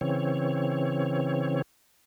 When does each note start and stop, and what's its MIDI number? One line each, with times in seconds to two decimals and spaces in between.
0.01 1.62 49
0.01 1.62 52
0.01 1.62 60
0.01 1.62 73